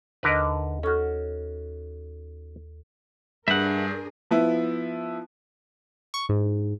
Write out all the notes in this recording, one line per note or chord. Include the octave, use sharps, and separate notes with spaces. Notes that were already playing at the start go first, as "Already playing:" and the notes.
D#2 D3 A#4 B4 D#5
C#4 F#4 A4 F6
G2 D4 G#4 A#4 E5 F#5
F3 B3 E4
C#6
G#2